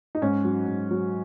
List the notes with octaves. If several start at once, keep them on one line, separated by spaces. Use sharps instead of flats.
D#4
G#2 C#4
F#3
G#2
F#3